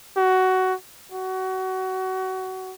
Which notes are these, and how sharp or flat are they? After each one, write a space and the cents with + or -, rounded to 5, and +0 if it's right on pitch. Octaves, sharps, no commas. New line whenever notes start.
F#4 +15
F#4 +25